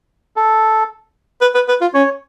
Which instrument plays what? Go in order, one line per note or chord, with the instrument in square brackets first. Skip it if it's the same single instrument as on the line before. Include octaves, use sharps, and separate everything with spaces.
[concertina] A4
[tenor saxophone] B4
B4
B4
F4
[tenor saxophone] C#4 [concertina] C#5